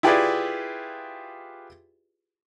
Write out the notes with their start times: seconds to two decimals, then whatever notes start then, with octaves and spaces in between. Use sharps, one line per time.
0.03 E4 F4 G4 G#4 B4 D5